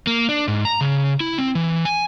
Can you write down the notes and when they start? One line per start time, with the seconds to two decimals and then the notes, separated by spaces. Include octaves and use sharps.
0.07 A#3
0.29 D4
0.48 G#2
0.65 A#5
0.81 C#3
1.20 E4
1.38 C4
1.55 E3
1.85 G#5